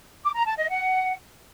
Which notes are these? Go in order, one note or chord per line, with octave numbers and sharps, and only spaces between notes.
D6
A#5
A5
D#5
F#5